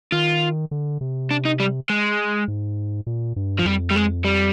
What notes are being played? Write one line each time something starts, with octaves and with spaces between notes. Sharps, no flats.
D#3 F4
D3
C3
D4
D#4
G3
G#3
G#2
A#2
G2
F3
F2 G3
G3
G#3
G3